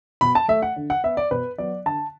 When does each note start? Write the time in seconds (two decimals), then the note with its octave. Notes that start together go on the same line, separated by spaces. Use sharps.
0.21 B2 B5
0.35 A5
0.48 A3 E5
0.62 F#5
0.76 D3
0.90 F#5
1.04 B3 E5
1.17 D5
1.31 B2 B4
1.58 F#3 B3 D5
1.86 D3 A5